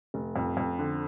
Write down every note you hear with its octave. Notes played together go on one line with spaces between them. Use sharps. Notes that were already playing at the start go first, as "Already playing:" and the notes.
F1
F2
F2
D3